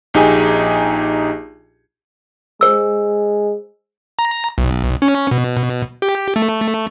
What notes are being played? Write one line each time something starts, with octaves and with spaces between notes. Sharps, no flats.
A#1 D#4 G4 G#4 G#5
G#3 C5 E6
A#5
B1
C#4
B2
G4
A3